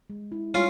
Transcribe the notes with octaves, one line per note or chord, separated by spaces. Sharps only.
G#3
E4
G3 C#4 F4